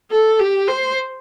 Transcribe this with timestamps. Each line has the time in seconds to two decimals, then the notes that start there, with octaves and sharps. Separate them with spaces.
0.11 A4
0.39 G4
0.68 C5